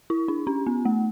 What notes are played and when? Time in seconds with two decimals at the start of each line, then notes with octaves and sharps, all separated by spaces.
0.10 E4
0.28 D4
0.47 C#4
0.67 B3
0.85 A3